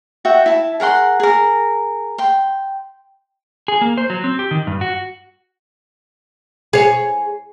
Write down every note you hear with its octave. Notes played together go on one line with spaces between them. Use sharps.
F#4 E5 G5
E4 A5
G#4 A#4 F#5 C6
G#4 A#4
G5 C6
G#4
A#3
C5
F#3
C4
G4
D#3
G2
F#4
G#4 C#5